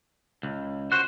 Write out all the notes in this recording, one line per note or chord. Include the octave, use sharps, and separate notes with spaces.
C#2
F#4 C5 F#6